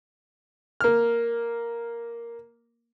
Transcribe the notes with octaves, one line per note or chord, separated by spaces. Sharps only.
A#3 F6